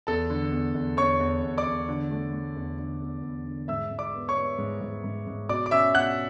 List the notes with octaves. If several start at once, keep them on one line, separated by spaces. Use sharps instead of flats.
E2 A4 A5
D3
E2
E2
E2 C#5 C#6
E2
E2
D5 D6
E2
D3
A3
A3
E2
D3
E2
E2
D3
G#2 E5 E6
G#2
D5 D6
B3
C#5 C#6
B3
G#2
G#2
G#2
G#2
B2 D5 D6
D6
C#4 E5 E6
B2 F#5 F#6